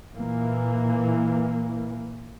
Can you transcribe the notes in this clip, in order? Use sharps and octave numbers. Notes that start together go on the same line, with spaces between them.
A#2 E3 A#3